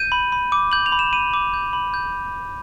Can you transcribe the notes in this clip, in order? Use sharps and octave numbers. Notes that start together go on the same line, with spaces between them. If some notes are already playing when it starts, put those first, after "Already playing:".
Already playing: G6 D#7
B5
B5
D6
G6 F#7
F7
B5
E7
B5 D#7
D6
G6
B5
G6